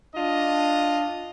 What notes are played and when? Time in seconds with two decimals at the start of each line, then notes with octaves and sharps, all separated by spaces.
0.15 D4 F4 D#5